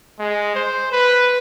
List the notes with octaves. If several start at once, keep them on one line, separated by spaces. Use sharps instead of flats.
G#3
C5
B4